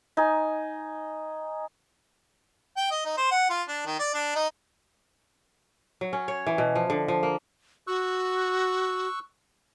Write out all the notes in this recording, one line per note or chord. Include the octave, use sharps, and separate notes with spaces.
D#4 G#5
G5
D#5
D#4
C5
F#5
F4
D4
D#3
D5
D4
D#4
F#3
C#4
C#5
E3
B2
F3
D3
F3
A#3
F#4 C#6 E6 F#6